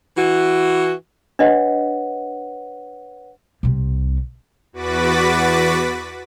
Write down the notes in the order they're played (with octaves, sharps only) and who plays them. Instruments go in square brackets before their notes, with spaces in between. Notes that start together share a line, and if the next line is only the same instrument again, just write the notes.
[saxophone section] E3 F#4
[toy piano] D4 D#5 [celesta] B4 C#5 F#5
[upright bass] C2 C3
[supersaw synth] E2 F#4 B4 D6 A6 B6